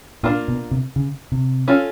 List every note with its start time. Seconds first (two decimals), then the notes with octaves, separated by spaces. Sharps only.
0.23 A#2 A#3 D4 F4 A#4
0.48 B2
0.71 C3
0.96 C#3
1.32 C3
1.68 C#4 F4 A4